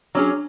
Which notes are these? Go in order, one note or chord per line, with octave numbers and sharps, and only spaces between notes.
F#3 C#4 D4 G#4